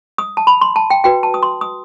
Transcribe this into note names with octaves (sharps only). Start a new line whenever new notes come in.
D#6
A5
B5
C6
A5
G5
F#4 B4 G5
A5
D#6
C6
D#6